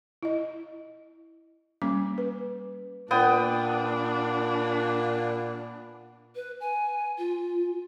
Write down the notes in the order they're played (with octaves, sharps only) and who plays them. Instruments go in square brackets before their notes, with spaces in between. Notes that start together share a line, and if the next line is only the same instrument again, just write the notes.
[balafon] E4 D#5
G3 A#3 C#4 D6
B4
[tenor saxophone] A#2 [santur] B3 G5 D#6 [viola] D4
[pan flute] B4
G#5
F4